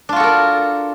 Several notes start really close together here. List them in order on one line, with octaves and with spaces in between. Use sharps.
D4 F4 F#4 A4 A#4